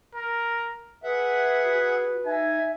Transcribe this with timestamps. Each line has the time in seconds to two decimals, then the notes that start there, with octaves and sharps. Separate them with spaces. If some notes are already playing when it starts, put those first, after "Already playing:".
0.15 A#4
1.03 G#4 B4 E5 F#5
1.65 F#4
2.26 D#4 E5 G#5